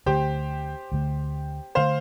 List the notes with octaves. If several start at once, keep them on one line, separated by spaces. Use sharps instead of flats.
D2 D3 A3 G4 C5
D2 D3 A3
D3 A3 C5 F5